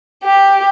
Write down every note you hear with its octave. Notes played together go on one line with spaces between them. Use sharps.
G4